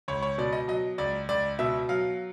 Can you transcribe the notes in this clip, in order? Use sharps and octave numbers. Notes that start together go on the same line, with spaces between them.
C#2 C#5
C#5
B2 D5
D#5
F#3 D#5
C#2 D5
C#2 D5
B2 E5
F#3 F5